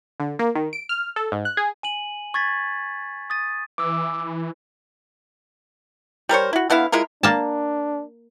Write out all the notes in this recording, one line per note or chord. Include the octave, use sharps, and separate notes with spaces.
D3
A#3
D#3
D7
F6
A4
G#2
F#6
G#4
G#5 D#7 F#7
C#6 G#6 A6 B6
D#6 A6 D#7
E3 D6 E6
G3 A#4 C5 C#5
E4 F#4
D3 B3 E4 F5
G#3 E4 F4 A#4
A#3 D4 A5